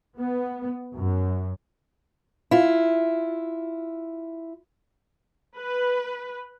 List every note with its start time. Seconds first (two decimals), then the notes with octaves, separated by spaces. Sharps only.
0.17 B3
0.96 F#2
2.51 E4 F4
5.57 B4